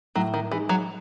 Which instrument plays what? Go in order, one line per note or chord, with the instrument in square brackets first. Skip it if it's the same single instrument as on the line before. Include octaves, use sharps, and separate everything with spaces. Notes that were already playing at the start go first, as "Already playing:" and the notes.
[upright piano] A2 [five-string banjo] F#3
[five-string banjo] D#3
[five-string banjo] E3 [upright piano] G#3 D#4
[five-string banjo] F#3